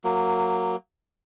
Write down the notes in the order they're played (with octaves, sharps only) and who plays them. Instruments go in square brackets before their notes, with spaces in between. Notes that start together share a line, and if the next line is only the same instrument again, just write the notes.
[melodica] F#3 A#3